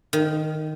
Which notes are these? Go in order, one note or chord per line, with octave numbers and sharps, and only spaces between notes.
D#3